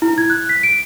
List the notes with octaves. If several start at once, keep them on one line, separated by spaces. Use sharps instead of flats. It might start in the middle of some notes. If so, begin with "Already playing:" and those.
E4
G#6
F#6
B6
D7